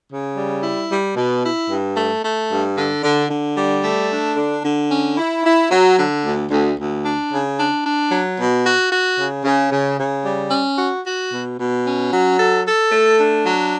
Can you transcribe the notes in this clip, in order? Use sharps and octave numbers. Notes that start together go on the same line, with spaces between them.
C#3
G3
E4
G3
B2
E4
G2
A3
A3
G2
D3
D3
D3
G3
A3
D4
D3
D3
C#4
E4
E4
F#3
D3
D2
D2
D2
D4
C#3
D4
D4
F#3
B2
F#4
F#4
C#3
C#3
C#3
C#3
G3
C#4
F#4
F#4
B2
B2
C#4
F#3
A4
A4
A3
D4
F#3